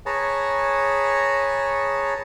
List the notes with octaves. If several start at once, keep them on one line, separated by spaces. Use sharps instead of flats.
G#4 B4 C#5 A5 A#5